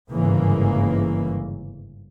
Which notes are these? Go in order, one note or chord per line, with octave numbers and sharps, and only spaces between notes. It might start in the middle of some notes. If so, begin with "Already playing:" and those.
G1 G#2 C#3 E3 A#3